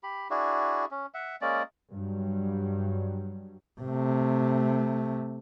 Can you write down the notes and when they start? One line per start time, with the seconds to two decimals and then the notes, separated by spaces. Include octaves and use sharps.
0.03 G4 B5
0.30 D4 E4 F#4 G#4
0.91 C#4
1.14 E5 F#5
1.41 G#3 A#3 C#4 D5
1.91 G2 F#3 G3
3.81 C3 A3